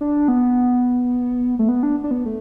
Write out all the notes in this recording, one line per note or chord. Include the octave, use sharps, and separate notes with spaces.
D4
B3
A3
B3
D4
D4
B3
A3